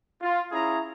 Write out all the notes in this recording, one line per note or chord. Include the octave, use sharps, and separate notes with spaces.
F4
C#4 E4 G#4 A#5